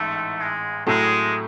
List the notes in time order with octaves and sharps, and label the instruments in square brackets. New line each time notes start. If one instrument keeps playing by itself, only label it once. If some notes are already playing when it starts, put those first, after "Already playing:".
Already playing: [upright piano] A1 G#2 [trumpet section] A3
[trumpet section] G#3
[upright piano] A2 F#3 A3 [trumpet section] G#3